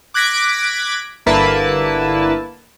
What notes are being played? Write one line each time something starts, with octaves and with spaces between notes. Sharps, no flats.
D6 F#6 G#6 A#6 B6 D7
G1 D3 A#3 E4 B4 A5